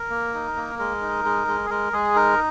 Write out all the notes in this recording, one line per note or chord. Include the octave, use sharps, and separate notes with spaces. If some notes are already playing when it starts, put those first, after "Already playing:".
Already playing: A#4
A#3
D#4
A#3
G#3 A#4
D#4
G#3
G#3
G#4
G#3 A#4
G#3 G#4
D#4 A#4